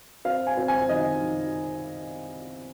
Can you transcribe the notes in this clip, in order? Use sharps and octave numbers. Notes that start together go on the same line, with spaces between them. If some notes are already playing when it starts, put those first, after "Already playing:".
C4 F5
G#5
C4
G#5
D#3 D#5
D#3